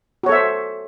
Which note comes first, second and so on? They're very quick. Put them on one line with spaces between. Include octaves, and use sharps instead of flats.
F#4 C#5 A4 E5 C5